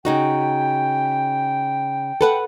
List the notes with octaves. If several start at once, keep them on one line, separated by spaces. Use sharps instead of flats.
C#3 D#4 F#4 G5
A4 B4 F#5